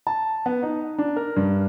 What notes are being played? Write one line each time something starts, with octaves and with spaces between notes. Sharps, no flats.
A5
B3
D#4
D4
A#4
G2